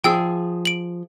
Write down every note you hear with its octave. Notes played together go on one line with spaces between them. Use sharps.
F3 G#4 G5 E6
D7 F#7